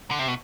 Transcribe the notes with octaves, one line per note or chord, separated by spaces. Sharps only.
D3
C3
B2